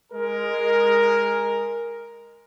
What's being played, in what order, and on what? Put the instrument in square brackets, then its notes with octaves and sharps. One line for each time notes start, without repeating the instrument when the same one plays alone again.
[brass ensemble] G#3 A#4